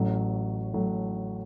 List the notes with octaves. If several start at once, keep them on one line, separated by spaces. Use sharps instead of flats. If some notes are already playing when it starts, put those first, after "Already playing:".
Already playing: A1 A2 F#3
A2 F#3